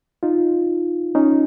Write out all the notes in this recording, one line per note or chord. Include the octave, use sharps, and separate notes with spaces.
D#4 F4
C#4 D#4